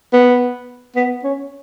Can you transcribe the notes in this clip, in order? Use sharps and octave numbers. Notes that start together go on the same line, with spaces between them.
B3
B3
C#4